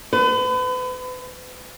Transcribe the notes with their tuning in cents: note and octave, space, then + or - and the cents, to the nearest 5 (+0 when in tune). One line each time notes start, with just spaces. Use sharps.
B4 +40